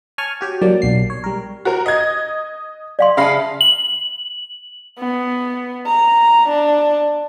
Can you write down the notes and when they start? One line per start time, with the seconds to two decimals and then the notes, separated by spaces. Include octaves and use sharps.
0.18 C#5 G#5 A5 C#6 F6
0.41 F#4 G4 C#5
0.62 F#3 G3 A#3 D4 D5
0.82 B1 C7
1.10 C#5
1.24 G3 A#4
1.65 F#4 A#4
1.86 D#5 G#6
2.99 D5 F5 C6
3.17 C#3 E5 F5 A5 B5
3.61 F#7
4.99 B3
5.86 A#5
6.49 D4